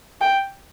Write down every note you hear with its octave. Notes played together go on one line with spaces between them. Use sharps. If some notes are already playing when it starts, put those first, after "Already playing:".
G5